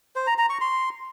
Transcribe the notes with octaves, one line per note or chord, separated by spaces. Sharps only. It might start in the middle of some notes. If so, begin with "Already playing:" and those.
C5
A#5
A#5
C#6
C6